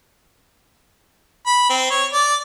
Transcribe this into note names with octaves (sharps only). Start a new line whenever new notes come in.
B5
C4
C#5
D5